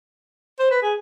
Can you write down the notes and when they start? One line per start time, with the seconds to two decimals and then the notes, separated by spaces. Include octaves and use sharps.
0.60 C5
0.71 B4
0.82 G#4